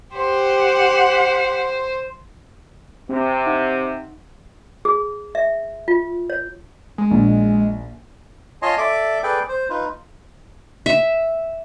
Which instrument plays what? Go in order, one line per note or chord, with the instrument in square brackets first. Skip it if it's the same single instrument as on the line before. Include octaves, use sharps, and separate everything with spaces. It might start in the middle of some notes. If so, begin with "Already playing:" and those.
[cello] G4 F#5 [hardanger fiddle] C5
[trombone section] C3 [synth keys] C4
[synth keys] D#4 F#5
[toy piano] G#4
E5
F4
C#5
[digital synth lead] G#3
[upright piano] A#1
[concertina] F4 C#5 D#5 G#5 A5 C6
A4 D5 E5 D6
G#4 A4 B4 D5 G5
C5
D#4 F4 B4
[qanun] E5